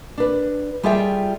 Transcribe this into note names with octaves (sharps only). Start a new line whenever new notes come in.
D4 B4
G3 F4 G#4 A4 E5 G5